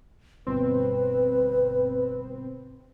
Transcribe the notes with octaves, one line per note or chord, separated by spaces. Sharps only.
G1 B2 C4 B4